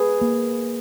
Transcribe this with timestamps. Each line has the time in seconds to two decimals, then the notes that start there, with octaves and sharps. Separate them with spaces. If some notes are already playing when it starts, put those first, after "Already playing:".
Already playing: G#4 B4
0.21 A#3